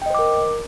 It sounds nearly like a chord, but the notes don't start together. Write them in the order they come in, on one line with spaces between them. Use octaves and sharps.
G5 D#5 C5 D6 A#4